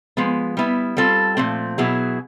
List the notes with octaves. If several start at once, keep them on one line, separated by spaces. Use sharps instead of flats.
F3 G#3 B3
G3 B3 E4
G3 C4 F4 A4
A#2 F3 A3 C4
B2 F#3 B3 E4 G#4